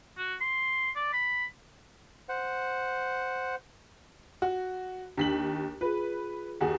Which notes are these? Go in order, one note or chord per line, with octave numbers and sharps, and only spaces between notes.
F#4
C6
D5
B5
C5 F#5
F#4
D#2 D4 B6 F#7
F4 G#4 B4
D#2 F#4 G#4